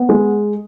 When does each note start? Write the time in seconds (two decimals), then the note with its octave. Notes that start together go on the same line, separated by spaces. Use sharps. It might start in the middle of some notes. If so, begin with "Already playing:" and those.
Already playing: B3
0.09 G#3